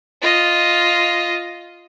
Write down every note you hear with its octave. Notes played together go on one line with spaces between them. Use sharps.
F4 D#5